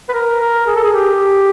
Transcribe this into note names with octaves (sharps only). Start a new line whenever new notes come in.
B4
A#4
A#4
G#4
A4
G#4
G4